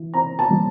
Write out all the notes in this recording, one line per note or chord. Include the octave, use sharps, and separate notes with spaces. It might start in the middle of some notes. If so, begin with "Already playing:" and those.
Already playing: E3
C4 A#5
A5
G3